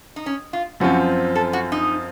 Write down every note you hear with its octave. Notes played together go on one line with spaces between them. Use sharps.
D#4
C#4
F4
F#2 F3 C4 F4 F#4
A4
F#4
D#4